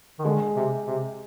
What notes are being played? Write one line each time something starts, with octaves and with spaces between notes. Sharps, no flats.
D#3
D3 G#3
C3
C3